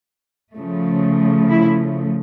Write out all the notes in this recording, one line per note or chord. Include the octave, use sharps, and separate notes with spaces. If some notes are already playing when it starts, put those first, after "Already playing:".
C#3 F3 A3
E4